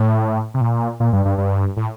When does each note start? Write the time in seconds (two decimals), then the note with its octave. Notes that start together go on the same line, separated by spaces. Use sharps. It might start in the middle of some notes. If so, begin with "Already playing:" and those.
Already playing: A2
0.54 C3
0.61 A#2
1.00 A#2
1.13 G2
1.25 G2
1.38 G2
1.77 A2